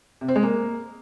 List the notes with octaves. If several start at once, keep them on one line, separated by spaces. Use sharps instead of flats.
C3
C4
G#3
A#3